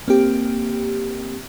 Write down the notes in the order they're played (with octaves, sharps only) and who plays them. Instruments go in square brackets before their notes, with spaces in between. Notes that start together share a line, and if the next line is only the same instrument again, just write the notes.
[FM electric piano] A#3 C4 G4